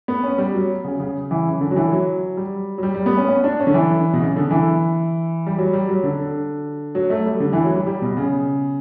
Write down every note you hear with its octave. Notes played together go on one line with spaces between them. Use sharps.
B3
C#4
G3
F#3
C#3
C#3
E3
C#3
D3
F#3
E3
F#3
G3
F#3
G3
G3
B3
C#4
C#4
D4
C#4
D3
E3
B2
C#3
D3
E3
G3
F#3
G3
F#3
D3
F#3
A3
G3
D3
E3
F#3
G3
G3
B2
C#3